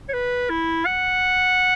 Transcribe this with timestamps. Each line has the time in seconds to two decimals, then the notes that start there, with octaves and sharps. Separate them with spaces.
0.09 C#5
0.13 B4
0.50 E4
0.85 F#5